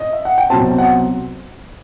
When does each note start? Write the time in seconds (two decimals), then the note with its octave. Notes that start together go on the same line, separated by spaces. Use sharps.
0.00 D#5
0.13 E5
0.25 F#5
0.38 G5
0.50 C2 B2 F#3 C4 A5
0.78 F#5